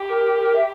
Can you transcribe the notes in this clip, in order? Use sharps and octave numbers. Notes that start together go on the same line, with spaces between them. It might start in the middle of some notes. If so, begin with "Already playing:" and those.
Already playing: G4
A#4
A#4
E5